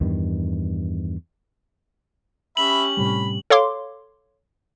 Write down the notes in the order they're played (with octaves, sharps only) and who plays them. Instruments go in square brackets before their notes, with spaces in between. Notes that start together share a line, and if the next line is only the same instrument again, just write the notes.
[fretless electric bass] E2 G2 D#3
[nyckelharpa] C#4 G4 [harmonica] E5 B5 [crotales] F#7
[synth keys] A2 C3 G3 [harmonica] B5
[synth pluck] A4 C#5 F5 C6 D6